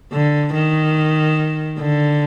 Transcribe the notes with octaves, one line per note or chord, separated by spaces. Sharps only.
D3
D#3
D3